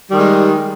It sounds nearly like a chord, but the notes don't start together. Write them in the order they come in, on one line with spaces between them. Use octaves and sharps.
G3 D#3 G#3